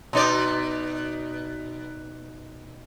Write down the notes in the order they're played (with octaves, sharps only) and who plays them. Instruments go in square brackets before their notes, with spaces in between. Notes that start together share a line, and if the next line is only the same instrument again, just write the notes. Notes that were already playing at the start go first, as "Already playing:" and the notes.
[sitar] B2 D#4 D5